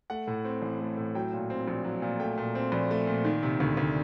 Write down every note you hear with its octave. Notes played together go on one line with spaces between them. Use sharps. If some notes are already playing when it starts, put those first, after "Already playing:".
A3 F#5
A2
C4
A1
A3
A2
F#3 G5
A#2
C4
A#1
F#3
A#2
A3 G5
A#2
C4
A#1
A3
A#2
D#3
C3
D2
D2